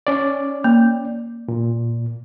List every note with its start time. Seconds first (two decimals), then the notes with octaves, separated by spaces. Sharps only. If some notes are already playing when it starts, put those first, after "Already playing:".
0.07 C#4 D5
0.64 A#3
1.48 A#2